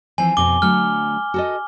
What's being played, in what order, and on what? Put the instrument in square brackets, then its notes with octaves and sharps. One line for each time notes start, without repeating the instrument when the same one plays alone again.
[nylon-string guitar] E3 F3 C4 [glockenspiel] G#5
[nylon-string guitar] F2 B2 [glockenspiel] D6 G7
[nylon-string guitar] D3 F#3 A3 [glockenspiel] F6
[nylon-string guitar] F#4 A4 D#5